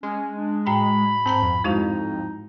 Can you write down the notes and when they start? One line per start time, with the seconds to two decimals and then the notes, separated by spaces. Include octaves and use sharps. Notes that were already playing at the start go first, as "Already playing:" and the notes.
0.03 G#3 C#4
0.36 D4
0.66 A2 G5 A5 B5
1.26 G#2 C4 A5 A#5
1.42 F2
1.64 F2 G#3 D#4 E4 F#4